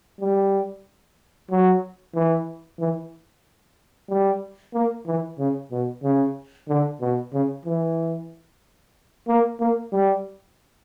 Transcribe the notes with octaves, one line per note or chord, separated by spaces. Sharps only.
G3
F#3
E3
E3
G3
A#3
E3
C#3
B2
C#3
D3
B2
C#3
E3
A#3
A#3
G3